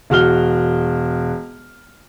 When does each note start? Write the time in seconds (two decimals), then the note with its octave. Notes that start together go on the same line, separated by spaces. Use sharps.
0.10 E1 F#4 F6 G7